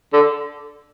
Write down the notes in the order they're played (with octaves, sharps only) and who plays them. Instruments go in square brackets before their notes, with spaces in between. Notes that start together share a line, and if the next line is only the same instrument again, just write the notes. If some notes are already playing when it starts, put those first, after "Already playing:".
[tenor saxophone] D3